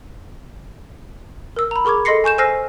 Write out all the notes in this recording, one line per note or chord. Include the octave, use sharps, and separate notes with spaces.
A#4 E6
A#5 B5
G#4 A#4 C#6 D6 G#6
A4 D#5 C6 A#6 C7 C#7
G#5 C#6 G6 E7
C5 G#5 E6 F6 A#6 C7